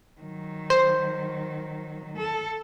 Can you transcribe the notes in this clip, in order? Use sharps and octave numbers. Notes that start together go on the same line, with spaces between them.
D#3 F#3
C5
A4